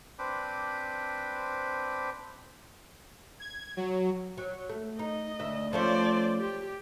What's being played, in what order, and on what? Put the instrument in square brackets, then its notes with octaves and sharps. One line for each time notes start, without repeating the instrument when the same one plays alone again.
[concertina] C4 D4 B4 C5 B5 D6
[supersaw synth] G#6
F#3
[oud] F#3
A3
[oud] D#4 [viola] D#5
[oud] D2 E5
[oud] F3 A3 C#4 [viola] C5 D5
[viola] G4